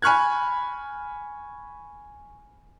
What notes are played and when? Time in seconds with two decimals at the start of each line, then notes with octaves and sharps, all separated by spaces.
0.02 G#5 B5 C#6 F6 F#6 G#6